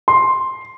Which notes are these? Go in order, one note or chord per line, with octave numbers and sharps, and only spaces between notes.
C6